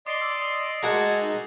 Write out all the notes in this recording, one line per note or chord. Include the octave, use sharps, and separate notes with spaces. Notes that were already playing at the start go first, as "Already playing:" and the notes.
D5 D#5 C6 D6 C7 G7
E6
D#6
G#3 F#4 A#4 F#5 G#5 A5
D#4